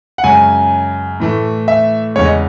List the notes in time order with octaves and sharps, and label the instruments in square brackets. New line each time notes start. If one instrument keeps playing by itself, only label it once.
[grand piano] F#5
F#2 C#3 G#3 G#5
A2 E3 A3
E5
E2 C#3 G#3 C#5
D#5